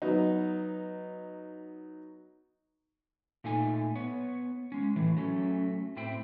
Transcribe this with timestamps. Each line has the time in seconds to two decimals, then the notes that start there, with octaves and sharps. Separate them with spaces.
0.02 F#3 B3 D#4
3.44 A#2 A3 D#4 G#5
3.95 B3 C#5
4.72 G#3 C#4
4.96 A2 E3
5.17 F#3 A3 C#4
5.96 A2 C4 E4 C5 G5